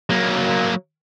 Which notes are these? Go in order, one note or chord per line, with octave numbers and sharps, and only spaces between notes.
F#3 A#3